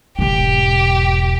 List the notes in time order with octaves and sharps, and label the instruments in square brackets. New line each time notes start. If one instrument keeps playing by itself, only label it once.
[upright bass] E1 G#2 [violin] G4